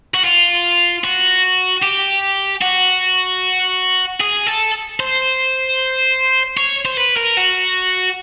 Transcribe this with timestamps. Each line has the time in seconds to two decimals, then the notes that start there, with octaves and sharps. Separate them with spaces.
0.14 F#4
0.24 F4
1.04 F#4
1.83 G4
2.62 F#4
4.20 G#4
4.46 A4
5.00 C5
6.57 C#5
6.85 C5
6.97 B4
7.16 A#4
7.37 F#4